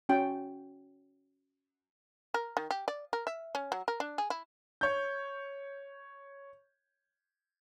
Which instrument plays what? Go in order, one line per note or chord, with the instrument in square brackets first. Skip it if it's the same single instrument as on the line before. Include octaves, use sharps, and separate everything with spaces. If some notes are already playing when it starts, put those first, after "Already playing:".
[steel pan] C#4 F#4 G5
[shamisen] A#4
D#3
G4
D5
A#4
E5
C#4
F#3
A#4
D4
G#4
E4
[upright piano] C#5 G6